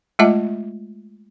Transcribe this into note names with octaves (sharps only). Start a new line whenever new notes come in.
G#3 A3 F4 D#5 E5 A5